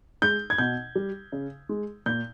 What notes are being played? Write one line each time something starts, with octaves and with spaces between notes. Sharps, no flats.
G#3 G6
G#6
B2 G6
G3
C#3
G#3
A#2 G6